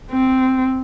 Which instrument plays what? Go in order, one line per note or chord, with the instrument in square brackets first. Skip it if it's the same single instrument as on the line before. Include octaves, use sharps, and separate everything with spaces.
[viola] C4